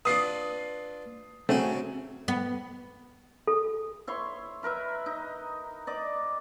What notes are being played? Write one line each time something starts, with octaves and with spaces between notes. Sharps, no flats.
D4 F4 B4 D#6 C7
C#3 F#3 A3 C4 C#4 F#4
B3
A4
E4 C#5 C6 C#6
E4 A#4 B4 E5
D#4
D5 D#5 D6